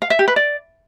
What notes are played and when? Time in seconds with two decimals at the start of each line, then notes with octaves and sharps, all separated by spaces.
0.02 F5
0.10 E5
0.19 G4
0.28 B4
0.36 D5